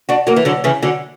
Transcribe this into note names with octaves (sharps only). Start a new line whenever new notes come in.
D4 F#4
F#3 A#3
E3
D3 F#3
C#3 E3
D3 F#3